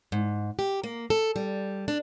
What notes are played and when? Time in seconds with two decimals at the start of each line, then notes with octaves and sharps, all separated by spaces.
0.12 G#2
0.59 G4
0.83 A#3
1.10 A4
1.36 G3
1.88 D4